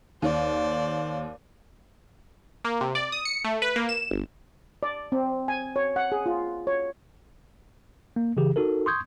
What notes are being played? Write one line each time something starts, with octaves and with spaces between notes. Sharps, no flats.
D#2 C5 D5
A#3
C3
D5
D#6
C#7
A3
B4
A#3
E7
G1
D5
C4
G#5
C#5
F#5
G#4
F4
C#5
A#3
C#3 E3 G4 G#4
D#4 F#4 A4 A#4
C6 C#6 D#6 G6 G#6